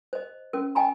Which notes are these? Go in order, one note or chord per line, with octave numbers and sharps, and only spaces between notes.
C5 D#5
C#4 A#4
D#5 G5 G#5 A#5 B5